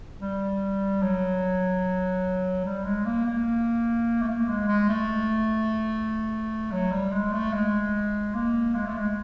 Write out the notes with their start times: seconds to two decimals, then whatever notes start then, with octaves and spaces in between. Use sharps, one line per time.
0.21 G3
1.02 F#3
2.65 G3
2.85 G#3
3.06 A#3
3.26 A#3
4.22 A3
4.28 A#3
4.48 G#3
4.68 G#3
4.89 A3
6.72 F#3
6.92 G3
7.12 G#3
7.33 A3
7.53 G#3
8.34 A#3
8.75 G#3
8.86 A3
8.97 G#3